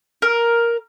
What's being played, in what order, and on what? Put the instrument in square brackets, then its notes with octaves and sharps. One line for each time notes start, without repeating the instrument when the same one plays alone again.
[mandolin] A#4